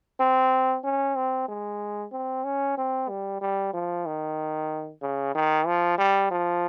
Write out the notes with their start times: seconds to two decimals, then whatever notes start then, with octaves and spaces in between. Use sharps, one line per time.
0.20 C4
0.84 C#4
1.16 C4
1.48 G#3
2.12 C4
2.44 C#4
2.77 C4
3.09 G3
3.41 G3
3.74 F3
4.06 D#3
5.02 C#3
5.35 D#3
5.66 F3
5.98 G3
6.31 F3